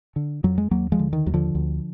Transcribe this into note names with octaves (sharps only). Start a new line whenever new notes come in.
D3
F2 F#3
G#3
D#2 F#3 A#3
F3 G#3
D3
D#3
D#2 F#3
D3 F3
D2